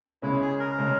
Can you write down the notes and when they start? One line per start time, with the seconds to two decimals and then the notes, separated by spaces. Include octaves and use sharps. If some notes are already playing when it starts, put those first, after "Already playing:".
0.22 C#3 G#3 C#4 E4
0.42 G#4
0.60 A#4
0.79 C#3 G#3 C#4